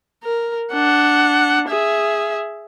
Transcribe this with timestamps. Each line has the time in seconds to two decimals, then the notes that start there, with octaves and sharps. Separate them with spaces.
0.23 A#4
0.73 D4 F#5
1.68 G#4 E5